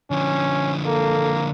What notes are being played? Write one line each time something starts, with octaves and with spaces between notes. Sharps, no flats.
D3 F3 C#4
A#3 A4